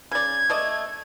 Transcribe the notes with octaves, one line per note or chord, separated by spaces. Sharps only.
C#3 D5 G#6
A3 D5 D#5